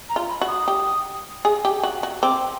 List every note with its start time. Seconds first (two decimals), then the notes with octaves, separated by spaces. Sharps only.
0.09 A#5
0.16 F4
0.29 B5
0.41 F#4
0.48 D#6
0.68 G4
1.45 G#4
1.65 G4
1.83 F#4
2.03 F#4
2.22 C4 D6